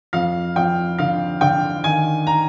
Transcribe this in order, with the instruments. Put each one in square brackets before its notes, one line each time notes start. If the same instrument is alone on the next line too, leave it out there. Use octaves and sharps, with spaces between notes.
[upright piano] F2 F5
F2 G5
D3 F5
D3 G5
D#3 G#5
A#5